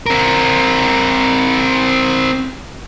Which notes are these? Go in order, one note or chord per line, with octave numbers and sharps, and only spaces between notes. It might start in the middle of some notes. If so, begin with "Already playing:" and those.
C4 A#4